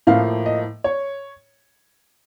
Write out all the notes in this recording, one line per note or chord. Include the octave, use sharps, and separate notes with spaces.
A2 F3 A#3 F5
D#5
C#5